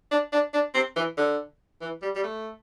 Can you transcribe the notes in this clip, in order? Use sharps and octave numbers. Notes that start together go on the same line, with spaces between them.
D4
D4
D4
C4
E3
D3
E3
G3
G3
A3